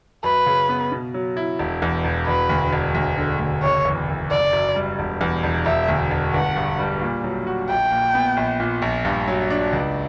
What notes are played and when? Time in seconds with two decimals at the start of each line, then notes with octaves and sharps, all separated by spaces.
0.23 F#2 B4
0.46 C#3
0.69 B3
0.92 B2
1.14 F#3
1.37 E4
1.59 E1
1.82 E2
2.05 E1
2.27 E1 B4
2.49 D2
2.73 E1
2.95 D2
3.18 D3
3.40 D2
3.62 F#1 C#5
3.85 E2
4.08 F#1
4.30 F#1 D5
4.53 F#2
4.76 G3
4.99 E1
5.21 E2
5.43 E1
5.66 E1 E5
5.88 D2
6.11 E1
6.34 G1 F#5
6.56 G2
6.79 G3
7.01 A#2
7.24 F#3
7.47 F#4
7.69 A#1 G5
7.92 A#2
8.15 B3
8.37 A#1
8.60 A#2
8.82 A#1
9.05 G2
9.28 F#3
9.50 D4
9.73 C#2